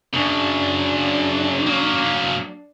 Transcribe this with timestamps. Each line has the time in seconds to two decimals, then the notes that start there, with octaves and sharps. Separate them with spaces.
0.13 F#2 C#3 D4
1.67 F#3 A#3